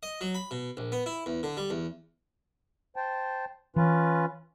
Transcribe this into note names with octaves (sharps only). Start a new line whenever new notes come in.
D#5
F#3
B5
B2
A#1
B3
E4
E2
D3
G3
E2
C5 G5 A5
E3 C#4 F4 B4